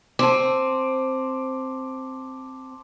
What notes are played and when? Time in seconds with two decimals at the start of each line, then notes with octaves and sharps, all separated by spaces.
0.19 C4 A5 D6